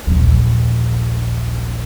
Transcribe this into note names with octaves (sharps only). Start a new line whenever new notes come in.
A#1 D#2